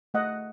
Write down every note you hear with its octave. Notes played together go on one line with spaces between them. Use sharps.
A3 D#5 F#5